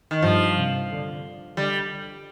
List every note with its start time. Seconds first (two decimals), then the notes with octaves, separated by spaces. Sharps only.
0.11 D#3
0.22 G2 F3
0.56 C3
0.89 D3
1.56 D3 G3